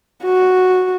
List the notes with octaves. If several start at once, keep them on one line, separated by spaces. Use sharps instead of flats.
F#4